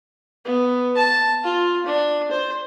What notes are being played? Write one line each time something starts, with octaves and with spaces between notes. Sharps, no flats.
B3
A5
F4
D4
C5